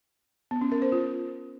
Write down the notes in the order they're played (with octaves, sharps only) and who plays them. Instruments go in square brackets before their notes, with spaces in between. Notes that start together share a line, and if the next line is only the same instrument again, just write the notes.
[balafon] B3
C#4
A#4
C5
F4